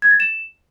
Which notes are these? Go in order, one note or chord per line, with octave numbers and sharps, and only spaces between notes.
G#6
A6
E7